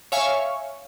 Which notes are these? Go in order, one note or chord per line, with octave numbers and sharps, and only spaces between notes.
C#5 E5 F5 G#5 C#6